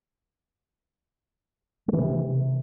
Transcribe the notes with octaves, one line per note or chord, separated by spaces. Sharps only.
G#3
E3
C3